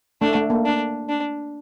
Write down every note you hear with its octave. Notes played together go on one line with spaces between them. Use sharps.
A3 D4
A3
A#3
D4
D4